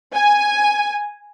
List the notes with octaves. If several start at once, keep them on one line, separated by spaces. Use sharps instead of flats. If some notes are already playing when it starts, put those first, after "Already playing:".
G#5